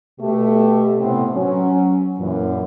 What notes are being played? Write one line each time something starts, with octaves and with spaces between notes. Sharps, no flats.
B2 A3 G4
A2 C3 B3 C4
F#3 C#4
F#2 A#2 E3